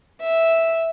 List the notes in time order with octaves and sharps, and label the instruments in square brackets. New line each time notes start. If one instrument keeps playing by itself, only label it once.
[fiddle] E5